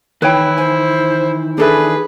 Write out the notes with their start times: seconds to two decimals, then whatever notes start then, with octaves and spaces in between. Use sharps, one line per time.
0.22 D#3 E3 E4 B4 C#5 G5
0.58 C5 G#5
1.58 D4 G#4 A4 B4 E5